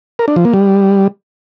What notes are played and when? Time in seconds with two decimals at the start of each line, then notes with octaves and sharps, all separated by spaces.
0.19 A#4
0.28 D4
0.36 F3
0.45 A#3
0.54 G3